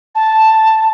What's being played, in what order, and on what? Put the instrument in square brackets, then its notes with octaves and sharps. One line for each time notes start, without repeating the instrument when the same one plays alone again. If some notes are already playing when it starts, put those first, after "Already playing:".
[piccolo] A5